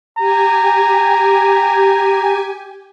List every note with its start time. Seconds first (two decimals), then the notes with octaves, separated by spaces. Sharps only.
0.17 G4 G#5 A#5